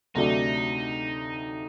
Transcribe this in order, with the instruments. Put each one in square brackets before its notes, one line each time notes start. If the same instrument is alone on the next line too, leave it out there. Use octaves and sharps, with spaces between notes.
[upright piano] D2 C3 F#3 A3 D4 [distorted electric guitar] D#4